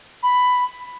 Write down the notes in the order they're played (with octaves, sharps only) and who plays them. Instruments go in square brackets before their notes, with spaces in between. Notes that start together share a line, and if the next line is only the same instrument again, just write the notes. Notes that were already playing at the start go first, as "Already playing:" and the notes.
[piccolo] B5